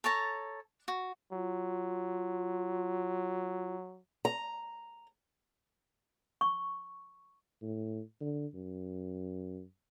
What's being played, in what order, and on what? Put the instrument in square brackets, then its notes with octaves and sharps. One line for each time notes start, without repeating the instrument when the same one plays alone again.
[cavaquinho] A4 C#5 A5 A#5
F#4
[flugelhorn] F#3 [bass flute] F4
[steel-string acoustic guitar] A#5
[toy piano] C#6
[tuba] A2
D3
F#2